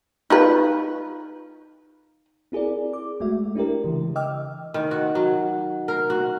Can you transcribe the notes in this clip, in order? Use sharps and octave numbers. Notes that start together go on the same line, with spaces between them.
D#4 F4 B4
C4 E4 G#4 A#4 D5
D6
G#3 A3 F#4 E5
D4 E4 G4 A#4
C#3 E3
D#5 G5 D6 E6 F6
D#3
F#4
F#3
A#4
F#4